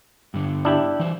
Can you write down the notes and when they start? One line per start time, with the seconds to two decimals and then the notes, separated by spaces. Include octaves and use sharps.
0.34 G2 D3
0.65 D4 E4 G4
1.00 E3 C5